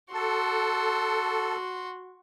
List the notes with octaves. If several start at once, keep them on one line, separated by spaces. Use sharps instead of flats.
F#4 A4 C6